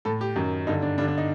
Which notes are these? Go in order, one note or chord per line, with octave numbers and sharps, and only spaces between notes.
A2 A4
G4
F#2 D#3
G2 D3 D#4
D4
G2 D3 D4
D4
D#4